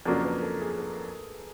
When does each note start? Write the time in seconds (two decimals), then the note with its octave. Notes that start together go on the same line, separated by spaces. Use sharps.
0.06 F2 C#3 F#3 A#3 D4 A#4
0.24 B4
0.42 A4
0.61 G#4
0.79 A4